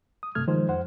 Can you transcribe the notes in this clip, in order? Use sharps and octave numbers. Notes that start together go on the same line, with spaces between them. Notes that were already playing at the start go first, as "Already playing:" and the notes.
D#6
G2 C3 A3 F6 G#6
D#3 F3 G#3 C5
F2 C5 F#5